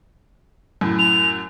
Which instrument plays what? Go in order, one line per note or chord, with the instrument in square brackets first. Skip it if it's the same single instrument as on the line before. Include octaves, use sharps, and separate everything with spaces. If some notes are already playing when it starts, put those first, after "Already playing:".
[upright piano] F#2 A2
[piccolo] F7